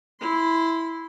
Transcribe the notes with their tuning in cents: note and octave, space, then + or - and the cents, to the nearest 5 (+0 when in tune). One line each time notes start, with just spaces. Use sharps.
E4 -5 C6 -25